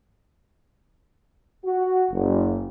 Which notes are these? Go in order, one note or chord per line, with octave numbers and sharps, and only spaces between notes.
F#4
F#1